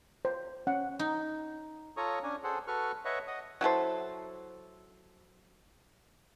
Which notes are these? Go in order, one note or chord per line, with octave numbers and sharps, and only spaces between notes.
C5
C#4 F#5
D#4
F4 A4 C#5 A#5 C#6 D#6
C#4 D4 G#5
G#4 A4 C5 F#5
F#4 A4 B4 C#6 F6
B4 C#5 D#5 E5 F#5 C#6
D#5 F#5 D#6
F#3 E4 A4 C5